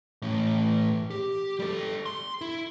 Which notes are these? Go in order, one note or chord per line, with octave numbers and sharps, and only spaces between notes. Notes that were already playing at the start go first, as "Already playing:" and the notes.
A2 E3
G4
G3 A4
C6
E4